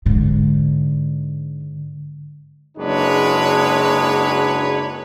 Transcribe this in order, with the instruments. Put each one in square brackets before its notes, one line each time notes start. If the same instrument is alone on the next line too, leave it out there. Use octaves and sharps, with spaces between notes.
[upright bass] G#2 D3
[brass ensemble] F#1 F#3 G#3 D4 B4 C#5